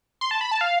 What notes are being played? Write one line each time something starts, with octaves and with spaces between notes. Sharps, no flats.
C6
A5
B5
A5
F5